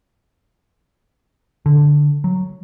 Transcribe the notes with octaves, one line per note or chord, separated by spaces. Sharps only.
D3
F#3